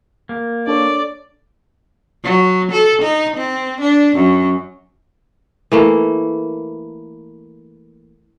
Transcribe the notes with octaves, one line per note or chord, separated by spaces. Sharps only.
A#3
D4 A4 C#5 D5
F#3
A4
D#4
C4
D4
F#2
E3 A3 A#3